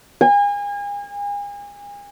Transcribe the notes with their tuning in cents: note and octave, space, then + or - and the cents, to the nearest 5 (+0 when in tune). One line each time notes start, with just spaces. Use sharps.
G#5 -35